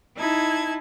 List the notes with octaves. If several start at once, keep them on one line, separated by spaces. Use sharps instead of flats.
D#4 E4 A5 G#6